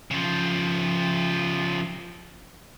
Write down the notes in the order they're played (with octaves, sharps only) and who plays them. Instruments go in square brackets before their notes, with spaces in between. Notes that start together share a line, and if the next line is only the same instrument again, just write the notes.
[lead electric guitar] C#3 F3